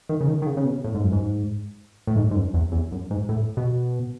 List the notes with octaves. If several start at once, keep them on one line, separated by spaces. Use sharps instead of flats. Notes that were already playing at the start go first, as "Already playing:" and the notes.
D#3
C#3
D#3
D#3
C#3
C#3
B2
A2
G#2
F#2
G#2
A2
G#2
G#2
F#2
E2
E2
F#2
G#2
A2
B2